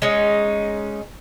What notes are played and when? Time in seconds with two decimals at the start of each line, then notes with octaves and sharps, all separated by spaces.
0.02 G#3 C#4 D#4